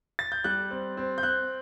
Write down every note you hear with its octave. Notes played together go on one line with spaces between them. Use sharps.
A6
G6
G3 F#6
C4
C4
G6
C4 F#6